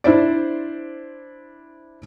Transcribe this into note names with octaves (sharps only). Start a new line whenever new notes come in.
D4 E4 C5 D5